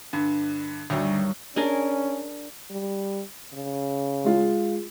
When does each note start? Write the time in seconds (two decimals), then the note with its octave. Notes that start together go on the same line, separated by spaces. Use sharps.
0.13 G2 D3
0.90 D2 G2 D#3 F#3
1.56 C#4 D4 G#4 A#4
2.70 G3
3.53 C#3
4.24 G#3 F4